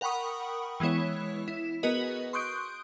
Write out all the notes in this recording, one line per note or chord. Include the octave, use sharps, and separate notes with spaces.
A#4 F#5 G5 B5 C#6 D#6
E3 G#3 B3 E4 C#5
E4
B3 F#4 G#4 A#4 B4 D#5
C6 C#6 D#6 F#6 G6 D7